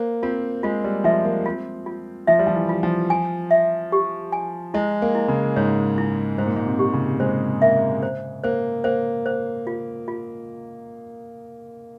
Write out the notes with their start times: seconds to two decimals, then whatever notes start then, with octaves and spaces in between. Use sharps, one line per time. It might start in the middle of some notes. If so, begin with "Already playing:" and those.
Already playing: A#3 C5
0.23 C4 F4
0.63 G#3 F4
0.84 G3
1.04 F3 E5
1.25 A#3
1.46 C4 F4
1.86 F4
2.27 F3 E5
2.39 G3
2.47 F3
2.55 E3
2.69 F4
2.83 F3
3.10 G#5
3.51 E5
3.92 G4
4.32 G#5
4.74 G#3 E4
5.02 A#3
5.15 E4
5.28 C#3
5.56 G#2 C#5
5.98 E4
6.38 G#2 C5
6.47 A#2
6.56 G#2
6.66 C3
6.79 G4
6.93 C#3
7.20 G#3 C5
7.62 A#3 E5
8.03 C5
8.43 A#3 C5
8.84 A#3 C5
9.26 C5
9.67 F4
10.08 F4